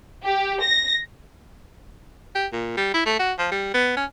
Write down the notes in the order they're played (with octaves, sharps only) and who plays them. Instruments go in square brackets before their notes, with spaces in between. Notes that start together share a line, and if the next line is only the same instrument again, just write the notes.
[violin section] G4
A#6
[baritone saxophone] G4
A#2
G3
E4
A3
F#4
F3
G3
B3
C#4